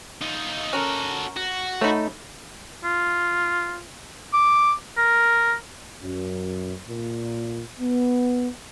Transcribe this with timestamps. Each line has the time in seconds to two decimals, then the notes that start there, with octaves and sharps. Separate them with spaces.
0.21 D#4 F4
0.73 C#4 F#4 A4 A#4
1.37 F#4
1.81 A3 D#4 C#5 B5
2.84 F4
4.33 D6
4.97 A#4
6.03 F#2
6.88 A#2
7.80 B3